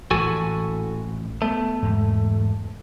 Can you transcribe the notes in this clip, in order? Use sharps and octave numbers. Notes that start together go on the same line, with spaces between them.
A1 A#2 E3 F#4 A4 G#5
A3 B3
E2 G#2